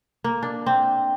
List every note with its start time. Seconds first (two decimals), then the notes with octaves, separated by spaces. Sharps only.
0.24 A#3
0.43 D4
0.66 C4